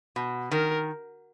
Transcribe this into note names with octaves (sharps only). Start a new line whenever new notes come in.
B2
D#3 A#4